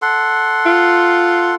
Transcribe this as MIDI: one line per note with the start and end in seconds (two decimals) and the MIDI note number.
0.02 1.55 69
0.02 1.55 78
0.02 1.55 84
0.66 1.56 65